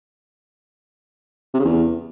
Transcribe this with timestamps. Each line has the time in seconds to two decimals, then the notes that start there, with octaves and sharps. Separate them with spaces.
1.54 C3
1.59 C#3
1.65 E2